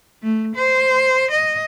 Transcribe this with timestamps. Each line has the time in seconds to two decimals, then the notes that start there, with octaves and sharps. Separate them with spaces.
0.22 A3
0.56 C5
1.31 D#5